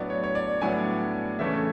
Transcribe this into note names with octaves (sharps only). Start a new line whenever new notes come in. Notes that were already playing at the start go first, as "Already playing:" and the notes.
Already playing: A2 F#3 B3 D4 D5
C#5
C#5
D5
A2 F#3 B3 D4 G#5
C#3 E3 A3 C#4 E5